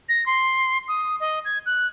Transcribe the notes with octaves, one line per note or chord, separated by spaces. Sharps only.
A#6
C6
D#6
D#5
G#6
F#6